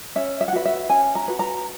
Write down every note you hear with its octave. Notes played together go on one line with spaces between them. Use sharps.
C#4 E5
E5
F#5
F#4 B4 E5
E5
C#4 G#5
A#5
F#4 B4
A#5